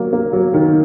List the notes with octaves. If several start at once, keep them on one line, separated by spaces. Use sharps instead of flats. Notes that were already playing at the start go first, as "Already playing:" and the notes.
Already playing: F#3 A#3
A#3
F#3
D#3